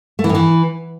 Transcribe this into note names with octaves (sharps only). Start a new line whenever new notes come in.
A3
E3
A2
E3